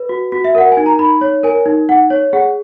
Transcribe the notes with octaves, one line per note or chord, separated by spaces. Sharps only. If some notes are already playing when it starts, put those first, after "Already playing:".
Already playing: B4
F#4
F#4
E5
A#4 F#5
G#5
D#4
A#5
D#4 B5
C#5
A#4 G#5
D#4
D#4 F#5
C#5
G#4 F#5